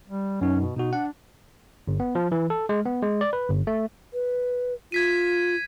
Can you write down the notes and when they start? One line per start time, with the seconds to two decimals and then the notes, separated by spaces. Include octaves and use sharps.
0.08 G3
0.41 F#2 C#4 D#4
0.60 B2
0.76 B2 D#4 F#4
0.93 D4 F#5
1.88 G1
2.00 B3
2.15 F3
2.32 E3
2.50 A4
2.69 G#3
2.85 B3
3.03 G#3
3.21 D5
3.33 B4
3.50 G1
3.67 A3
4.13 B4
4.92 F4 G#6 B6 D#7